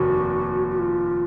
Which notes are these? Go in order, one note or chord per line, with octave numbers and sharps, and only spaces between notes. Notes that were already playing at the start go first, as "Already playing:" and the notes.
Already playing: F1 D#2 F#4
F#4
F4